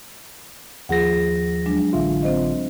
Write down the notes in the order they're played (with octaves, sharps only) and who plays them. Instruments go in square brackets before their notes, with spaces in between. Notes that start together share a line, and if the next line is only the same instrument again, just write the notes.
[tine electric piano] D#2 F3 A#6 [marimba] F4 G#4 F#5
[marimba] F#3 G#3 D4
[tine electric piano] A1 D3 F4 [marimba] E5
[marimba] C4 C5 D#5